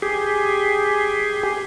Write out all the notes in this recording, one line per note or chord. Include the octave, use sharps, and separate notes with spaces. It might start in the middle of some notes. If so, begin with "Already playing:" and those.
G4 G#4